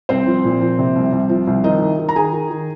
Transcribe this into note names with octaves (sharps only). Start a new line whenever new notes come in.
C2 C4 C5
F3
A#2
F3
C3
C2
C2
F3
C2
D#3 D#4 D#5
D#3
D#3
A#5
D#3 G#4 G#5
D#3
D#3